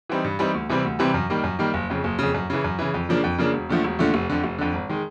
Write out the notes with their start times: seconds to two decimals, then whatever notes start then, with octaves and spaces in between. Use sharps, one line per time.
0.09 E3 G3 C4 D#4
0.24 G2
0.39 E3 G3 C4 D#4
0.54 D2
0.69 C3 E3 G3 C4
0.84 D2
0.99 C3 E3 G3 C4
1.14 F#2
1.30 D#3 G3 A#3
1.44 F#2
1.59 D#3 G3 A#3
1.74 F#1
1.90 F2 C#3
2.04 F#1
2.19 F2 C#3
2.34 F#2
2.50 C#3 E3
2.64 F#2
2.79 C#3 E3
2.94 F2
3.09 C#3 F3 A#3 D4
3.24 F2
3.38 C#3 F3 A#3 D4
3.54 E1
3.69 D#2 D3 F3 A3
3.84 E1
3.99 D#2 D3 F3 A3
4.14 F1
4.30 F2 D3
4.44 F1
4.58 F2 D3
4.73 G#1
4.89 D#3 G#3